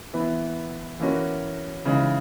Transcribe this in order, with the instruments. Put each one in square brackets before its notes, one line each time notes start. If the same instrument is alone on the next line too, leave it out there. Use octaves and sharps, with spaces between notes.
[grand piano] E3 B3 E4
E3 A#3 C#4 F#4
C#3 E3 G#3 D#4